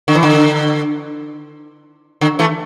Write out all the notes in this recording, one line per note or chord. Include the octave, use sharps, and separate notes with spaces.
D3
E3
D3
D3
E3 A3